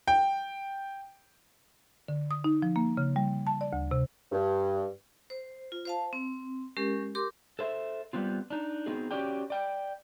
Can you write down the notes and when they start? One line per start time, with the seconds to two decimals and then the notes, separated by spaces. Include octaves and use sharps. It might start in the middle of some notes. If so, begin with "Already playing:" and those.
0.07 G5
2.08 D3
2.31 D#6
2.44 D#4
2.62 F3
2.76 A#3
2.97 C#3
3.16 G3
3.47 A5
3.61 D5
3.73 D2
3.91 C3
4.32 G2
5.30 C5
5.72 F4
5.85 C5 F5 A5
6.13 C4
6.77 G#3 C#4 G4 A#4
7.15 G4 A#4 C6 D6
7.59 A4 C5 E5
8.13 G3 B3 C4 F4
8.50 D4 D#4
8.86 B3 C4 D#4 F#4 G#4
9.11 C#4 F#4 G4 D5 G5
9.50 D5 G5